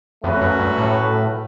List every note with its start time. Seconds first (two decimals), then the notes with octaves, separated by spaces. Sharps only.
0.24 F2 F#3 A3 C#4 F#4 B4
0.41 F#2
0.59 G2
0.78 A2